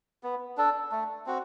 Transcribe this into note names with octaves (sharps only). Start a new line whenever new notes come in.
B3
D4 A4
A3
C4 F#4